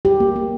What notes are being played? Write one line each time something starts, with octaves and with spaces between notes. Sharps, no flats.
G3 G4
A#3
A#3